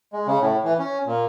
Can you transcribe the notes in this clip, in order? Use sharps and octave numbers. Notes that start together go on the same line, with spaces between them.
G#3
C#3
A2
E3
C#4
A#2